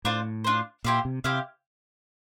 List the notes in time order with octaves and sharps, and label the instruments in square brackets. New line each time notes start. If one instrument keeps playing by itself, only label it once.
[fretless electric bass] A2 [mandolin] D4 F4 C5
[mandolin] D4 F4 C5
[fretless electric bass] A#2 [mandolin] E4 G4 C5 F5
[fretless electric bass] C3
[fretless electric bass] C3 [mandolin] E4 G4 C5 F5